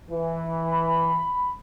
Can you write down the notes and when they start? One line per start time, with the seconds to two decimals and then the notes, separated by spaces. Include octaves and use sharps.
0.10 E3
0.68 B5